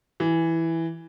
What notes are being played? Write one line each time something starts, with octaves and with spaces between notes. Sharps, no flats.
E3